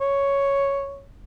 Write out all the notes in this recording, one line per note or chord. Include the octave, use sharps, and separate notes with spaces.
C#5